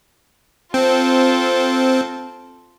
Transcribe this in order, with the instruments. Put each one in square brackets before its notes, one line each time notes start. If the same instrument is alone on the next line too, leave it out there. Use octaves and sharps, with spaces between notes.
[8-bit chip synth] C4 [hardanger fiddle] F4 A4